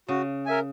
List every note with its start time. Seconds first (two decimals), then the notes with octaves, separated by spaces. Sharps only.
0.08 C#3 F#4
0.46 A#4 E5 G#5